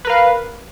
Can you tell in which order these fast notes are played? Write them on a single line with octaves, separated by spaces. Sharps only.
B4 A#4 F5